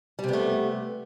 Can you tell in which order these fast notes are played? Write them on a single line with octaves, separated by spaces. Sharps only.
G3 C3 B3 A3